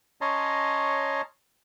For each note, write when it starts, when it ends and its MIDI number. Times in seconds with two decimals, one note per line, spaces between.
0.21 1.22 61
0.21 1.22 73
0.21 1.22 75
0.21 1.22 81
0.21 1.22 82
0.21 1.22 84